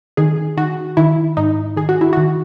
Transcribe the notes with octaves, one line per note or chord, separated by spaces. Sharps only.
D#3 G#4
D#3 F#4
D#3 E4
G#2 D#4
D#3 G#4
F#4
E4
D#3 F#4